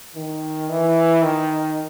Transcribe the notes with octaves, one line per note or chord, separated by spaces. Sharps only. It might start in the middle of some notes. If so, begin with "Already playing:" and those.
D#3
E3
D#3